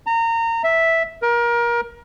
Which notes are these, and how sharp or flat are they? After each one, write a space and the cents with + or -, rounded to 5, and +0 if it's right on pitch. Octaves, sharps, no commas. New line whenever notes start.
A#5 -25
E5 -5
A#4 +25